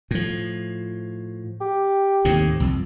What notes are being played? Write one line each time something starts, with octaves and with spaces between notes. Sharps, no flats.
A2 F3
G4
D#2 A2 C3
C2 F2